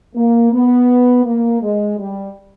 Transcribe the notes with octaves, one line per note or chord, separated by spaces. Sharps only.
A#3
B3
A#3
G#3
G3